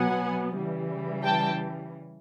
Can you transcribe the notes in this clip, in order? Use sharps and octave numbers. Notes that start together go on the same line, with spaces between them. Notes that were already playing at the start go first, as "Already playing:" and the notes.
Already playing: B2 F#3 B3 F#5 G#5
C#3 E3 G3
G5 A5